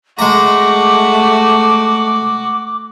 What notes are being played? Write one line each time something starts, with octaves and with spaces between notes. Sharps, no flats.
G#3 A3 F#4 A#5 D6